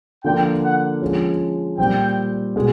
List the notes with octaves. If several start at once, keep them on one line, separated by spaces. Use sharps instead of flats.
D3 F3 A#3 D4 F4 G5
F#5
F3 G#3 C#4
A#2 G3 C4 G5
B2 G#3